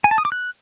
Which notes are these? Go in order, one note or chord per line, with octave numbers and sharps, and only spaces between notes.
G#5
A5
D#6
D6
F#6